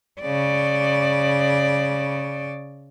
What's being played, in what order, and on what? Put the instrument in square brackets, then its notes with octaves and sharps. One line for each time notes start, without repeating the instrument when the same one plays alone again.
[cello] C#3 D5